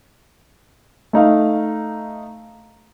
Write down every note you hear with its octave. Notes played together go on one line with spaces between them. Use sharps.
A3 D#4 F5